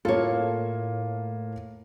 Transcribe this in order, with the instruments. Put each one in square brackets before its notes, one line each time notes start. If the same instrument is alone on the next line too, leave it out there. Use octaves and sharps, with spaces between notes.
[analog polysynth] A2 [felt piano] A#3 F4 [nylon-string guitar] A4 C#5